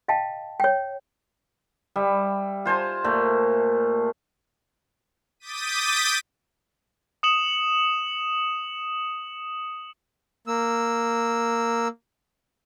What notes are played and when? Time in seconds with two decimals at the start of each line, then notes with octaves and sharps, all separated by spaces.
0.08 D#5 F5 G5 A5
0.60 C#5 G5
1.96 G3 E5
2.65 F4 C5 G#5 A5
3.04 A#2 A3
5.40 D6 D#6 G6 A6 B6 D#7
7.23 D#6 C#7 E7 F#7
10.47 A#3 E6